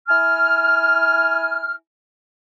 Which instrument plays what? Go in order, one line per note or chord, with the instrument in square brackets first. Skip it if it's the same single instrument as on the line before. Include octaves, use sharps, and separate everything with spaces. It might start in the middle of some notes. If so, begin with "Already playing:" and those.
[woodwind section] E4 G#5 F6